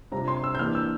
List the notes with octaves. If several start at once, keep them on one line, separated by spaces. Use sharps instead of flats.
C3 G3 D4 F4 A#5
C6
E6
G6
E3 A#3 D4 F6
E6